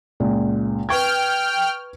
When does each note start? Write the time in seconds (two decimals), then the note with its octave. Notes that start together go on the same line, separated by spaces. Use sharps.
0.20 C#2 A#2
0.89 B4 G5 C#6 F6 G#6